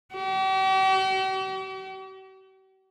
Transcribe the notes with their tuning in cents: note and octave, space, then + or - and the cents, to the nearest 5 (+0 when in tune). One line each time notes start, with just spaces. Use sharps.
G4 -45